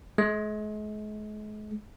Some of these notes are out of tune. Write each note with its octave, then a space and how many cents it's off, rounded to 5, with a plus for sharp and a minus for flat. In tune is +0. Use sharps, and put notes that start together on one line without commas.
G#3 +40